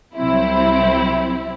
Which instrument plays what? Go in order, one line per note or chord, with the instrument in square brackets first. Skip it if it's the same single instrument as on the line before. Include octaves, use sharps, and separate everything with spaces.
[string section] C2 C3 F#3 C4 E4